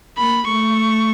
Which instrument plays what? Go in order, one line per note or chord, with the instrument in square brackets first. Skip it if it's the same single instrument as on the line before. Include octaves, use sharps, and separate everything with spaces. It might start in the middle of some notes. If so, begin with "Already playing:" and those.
[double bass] A#3 [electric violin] B5
[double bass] A3 [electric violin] C#6